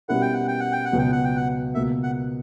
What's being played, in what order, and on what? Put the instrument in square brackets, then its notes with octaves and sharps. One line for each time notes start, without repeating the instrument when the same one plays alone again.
[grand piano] B2 G3 C#4 E4 A#4 [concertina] F#5
[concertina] G5
F#5
G5
F#5
G5
F#5
[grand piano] C#2 B2 F#3
[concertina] G5
F#5
G5
F#5
[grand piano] C#2 B2 A#3 [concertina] E5
[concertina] F#5